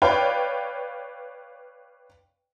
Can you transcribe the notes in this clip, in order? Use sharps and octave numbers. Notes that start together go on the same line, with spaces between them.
B4 C#5 D5 F5 G5